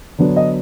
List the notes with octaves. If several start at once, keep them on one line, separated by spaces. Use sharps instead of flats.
D3 F#3 B3 D4
D#5